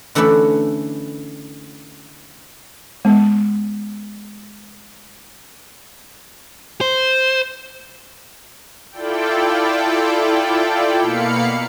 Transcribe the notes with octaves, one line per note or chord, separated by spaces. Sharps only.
D3 E3 A3 C#4 B4 D5
G#3 B3
C5
E4 F4 A4 D5 G5
B2 A#3 F5 B5 C#7